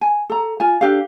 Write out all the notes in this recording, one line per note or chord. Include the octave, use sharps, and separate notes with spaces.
G#5
A4 A#5
F4 G#5
D4 G4 A4 F5